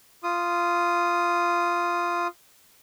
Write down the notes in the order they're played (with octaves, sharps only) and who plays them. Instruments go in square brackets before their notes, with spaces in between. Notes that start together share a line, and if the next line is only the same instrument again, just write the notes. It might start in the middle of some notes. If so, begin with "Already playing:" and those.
[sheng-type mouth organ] F4 D#6